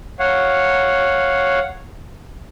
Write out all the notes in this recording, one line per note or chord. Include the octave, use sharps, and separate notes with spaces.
C#5 F5 F#5